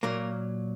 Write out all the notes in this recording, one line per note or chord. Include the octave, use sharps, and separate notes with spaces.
A#2 F#3 A#3 A#4